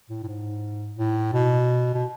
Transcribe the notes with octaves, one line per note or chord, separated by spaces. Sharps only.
A2
A2
G#2
A2
B2
B2